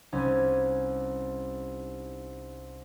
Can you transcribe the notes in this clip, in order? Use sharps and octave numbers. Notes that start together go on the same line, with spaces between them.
C2 C#4 D#4 G#5